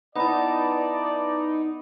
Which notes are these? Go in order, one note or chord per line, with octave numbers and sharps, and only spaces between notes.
B3 D#4 E4 D5 D#5 A5